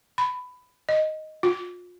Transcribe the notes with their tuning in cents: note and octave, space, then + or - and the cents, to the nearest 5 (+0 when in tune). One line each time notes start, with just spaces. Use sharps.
B5 +15
D#5 +0
F4 +35